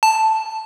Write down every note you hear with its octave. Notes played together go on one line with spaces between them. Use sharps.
A5